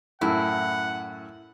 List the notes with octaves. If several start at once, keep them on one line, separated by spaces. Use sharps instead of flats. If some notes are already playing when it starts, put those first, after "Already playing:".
F#2 A2 E4 F#5